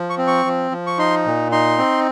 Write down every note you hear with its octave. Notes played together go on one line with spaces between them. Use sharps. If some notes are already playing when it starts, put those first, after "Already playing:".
Already playing: F3
C#6
C4
C#6
F3
F3
C#6
D#4 C6
A#2
D#4 C6
C4